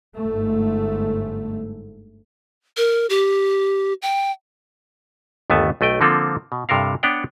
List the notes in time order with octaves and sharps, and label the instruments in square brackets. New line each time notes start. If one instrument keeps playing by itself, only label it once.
[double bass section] G1 G#2 A3
[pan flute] A#4
G4
G5
[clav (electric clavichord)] G1 D#2 A3 B3 G#5 A5
B1 A3 D#5 G5
D3 F3 A#3 C4 F4 A4
B2
G2 C3 A4 A#4 F5
B3 D4 B4 C#5 F#5 G5